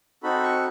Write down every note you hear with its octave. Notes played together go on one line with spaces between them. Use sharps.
C4 D#4 F#4 A4 B5
C#6